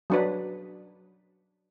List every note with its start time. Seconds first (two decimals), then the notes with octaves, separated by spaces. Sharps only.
0.10 F#3 D4 B4